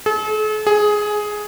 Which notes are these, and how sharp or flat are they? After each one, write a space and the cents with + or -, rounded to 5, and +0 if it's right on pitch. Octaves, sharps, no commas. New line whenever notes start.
A4 -45
G#4 +10